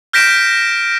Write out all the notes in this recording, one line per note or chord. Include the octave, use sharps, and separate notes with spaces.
F6 G6 A#6 B6 D7 E7